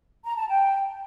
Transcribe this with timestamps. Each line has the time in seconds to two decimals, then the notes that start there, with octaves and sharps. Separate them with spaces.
0.25 A#5
0.36 A5
0.48 G5